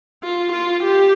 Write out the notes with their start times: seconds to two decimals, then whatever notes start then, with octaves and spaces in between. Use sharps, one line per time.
0.23 F4
0.52 F4
0.83 G4